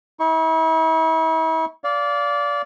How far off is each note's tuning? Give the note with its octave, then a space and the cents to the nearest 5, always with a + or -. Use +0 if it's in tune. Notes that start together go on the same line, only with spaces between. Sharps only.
E4 -40 C#6 -5
D5 -20 F5 +0